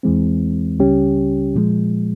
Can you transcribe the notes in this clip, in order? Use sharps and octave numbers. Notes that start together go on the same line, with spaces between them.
E2 E3 G#3 C4
C#2 C#3 G3 C#4 G4
A#2 F3 G#3